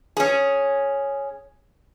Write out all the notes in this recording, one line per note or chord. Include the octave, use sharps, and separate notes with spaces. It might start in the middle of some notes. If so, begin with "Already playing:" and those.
C#4 G#4